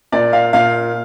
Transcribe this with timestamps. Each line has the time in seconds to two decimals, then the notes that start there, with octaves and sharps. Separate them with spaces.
0.12 A#2 D5
0.33 F5
0.53 A#2 F5